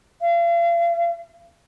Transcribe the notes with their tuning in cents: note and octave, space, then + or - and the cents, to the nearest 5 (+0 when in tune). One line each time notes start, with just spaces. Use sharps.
F5 -40